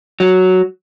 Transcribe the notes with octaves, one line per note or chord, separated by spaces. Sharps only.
F#3